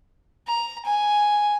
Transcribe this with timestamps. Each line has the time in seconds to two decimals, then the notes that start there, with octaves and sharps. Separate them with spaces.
0.47 A#5
0.85 G#5